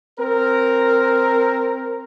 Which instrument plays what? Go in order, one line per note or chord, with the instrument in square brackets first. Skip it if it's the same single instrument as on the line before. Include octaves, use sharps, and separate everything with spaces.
[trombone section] C4 A#4